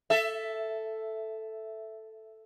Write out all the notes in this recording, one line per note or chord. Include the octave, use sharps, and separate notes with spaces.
A4 E5